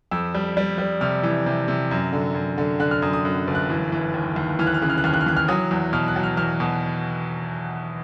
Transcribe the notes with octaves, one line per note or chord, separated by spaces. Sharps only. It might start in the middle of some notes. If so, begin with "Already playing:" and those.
F2 E6
G3
G3
G3
C3 F6
E3
C3
C3
F#2
D3
F#2
D3
D3 F#6
F6
F#2 D#6
D#6
F#2
G1
F#6
E3
E3
D#2
D#2
E3 F6
F#6
F6
C#3 F#6
F6
F#6
D#2 F6
F#6
F6
E3 F#6
F6
F#3 D#6
E2
B2 F6
F#6
F#3
F6
E2 F6
B2